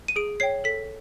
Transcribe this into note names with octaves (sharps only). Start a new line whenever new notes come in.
D#7
G#4 D7
C#5 E5 G5 C7
A4 B6